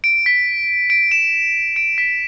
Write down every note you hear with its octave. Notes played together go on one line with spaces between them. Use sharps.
D7
B6
D7
E7
D7
B6